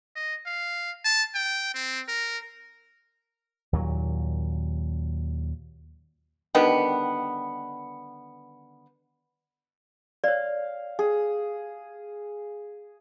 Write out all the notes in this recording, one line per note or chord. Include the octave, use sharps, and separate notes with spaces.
D#5
F5
A5
G5
C4
A#4
D#2 A#2 F#3
D3 D#3 G3 B3
C#5 D5 F5
G#4